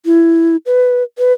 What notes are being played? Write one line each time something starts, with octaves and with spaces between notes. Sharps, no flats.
E4
B4
B4